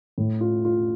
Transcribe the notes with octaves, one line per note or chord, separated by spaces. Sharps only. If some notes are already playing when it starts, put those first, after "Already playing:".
A2
F4
F4